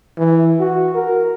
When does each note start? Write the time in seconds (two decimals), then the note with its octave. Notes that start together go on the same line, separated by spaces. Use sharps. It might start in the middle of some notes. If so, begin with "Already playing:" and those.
0.18 E3
0.60 F#4
0.94 A#4